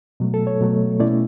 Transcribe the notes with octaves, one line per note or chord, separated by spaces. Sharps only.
B2 F#3 A3
A4
C#5
B2 F#3 A3
B2 A3 C#4 E4 D5